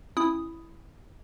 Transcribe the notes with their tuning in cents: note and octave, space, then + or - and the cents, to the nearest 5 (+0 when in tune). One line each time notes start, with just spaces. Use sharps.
C#4 -25 E4 +5 D#6 +0